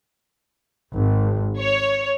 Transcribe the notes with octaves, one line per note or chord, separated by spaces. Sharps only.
G#1
C#5